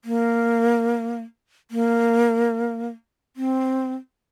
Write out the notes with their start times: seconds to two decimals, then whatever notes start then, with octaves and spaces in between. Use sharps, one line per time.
0.05 A#3
1.71 A#3
3.36 C4